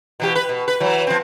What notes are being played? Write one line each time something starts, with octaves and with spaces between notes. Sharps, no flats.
B2 E3 G4
B4
B2
B4
E3 F#3
F3 C4